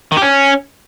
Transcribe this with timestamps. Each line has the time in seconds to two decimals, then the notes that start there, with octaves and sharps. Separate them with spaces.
0.12 D#3
0.17 G4
0.22 C#4